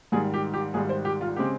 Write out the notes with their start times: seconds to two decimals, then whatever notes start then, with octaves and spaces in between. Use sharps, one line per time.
0.12 G#1 G#2 D#3 G3 G#4
0.34 G4
0.54 G4
0.74 G#1 G#2 D#3 G3 G#4
0.89 C5
1.05 G4
1.21 F4
1.36 C#3 G#3 C4 G4